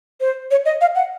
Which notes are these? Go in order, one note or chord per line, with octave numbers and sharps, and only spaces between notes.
C5
C#5
D#5
F5
F#5